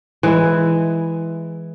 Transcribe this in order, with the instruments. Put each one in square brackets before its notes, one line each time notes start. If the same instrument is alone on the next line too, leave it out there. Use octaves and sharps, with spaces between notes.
[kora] E3 G#3 E4